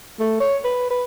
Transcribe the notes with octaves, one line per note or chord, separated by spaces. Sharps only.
A3
C#5
B4
B4